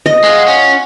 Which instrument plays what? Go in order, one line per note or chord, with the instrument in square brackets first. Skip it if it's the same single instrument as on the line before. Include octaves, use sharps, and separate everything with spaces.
[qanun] D#5
[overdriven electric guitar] G#3 [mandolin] F4 F#4 F#5
[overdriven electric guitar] C#4